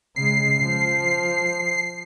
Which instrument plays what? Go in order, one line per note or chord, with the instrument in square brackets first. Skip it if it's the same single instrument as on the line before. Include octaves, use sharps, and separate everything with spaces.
[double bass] C#3 G#3 [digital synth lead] C7
[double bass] F3